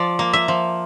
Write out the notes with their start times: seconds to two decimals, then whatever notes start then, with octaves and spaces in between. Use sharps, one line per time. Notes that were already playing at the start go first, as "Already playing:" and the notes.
Already playing: F3 D5
0.19 A#3
0.33 E5
0.48 F3